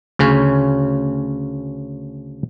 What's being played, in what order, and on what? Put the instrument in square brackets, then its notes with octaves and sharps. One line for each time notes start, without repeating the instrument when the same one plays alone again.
[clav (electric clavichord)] D2 C#3 C#4